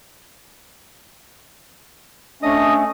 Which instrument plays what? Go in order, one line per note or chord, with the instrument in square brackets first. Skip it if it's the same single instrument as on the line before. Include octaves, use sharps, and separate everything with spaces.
[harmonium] A3 C#4 [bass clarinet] D4 [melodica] D#5 D#6